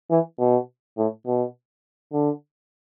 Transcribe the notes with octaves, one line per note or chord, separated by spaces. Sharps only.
E3
B2
A2
B2
D3